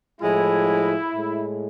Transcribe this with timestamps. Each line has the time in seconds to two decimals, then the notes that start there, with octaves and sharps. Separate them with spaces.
0.21 A2 F3 G#3 E4
1.12 A2 G#3